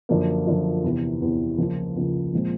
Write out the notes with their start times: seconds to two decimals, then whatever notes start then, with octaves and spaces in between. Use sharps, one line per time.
0.09 F#2 D3 F3 A#3
0.47 F#2 D3 F3 A#3
0.84 E2 C3 E3
1.22 E2 C3 E3
1.58 C#2 C#3 F3 A#3
1.96 C#2 C#3 F3 A#3
2.33 A#2 F3 G#3 C4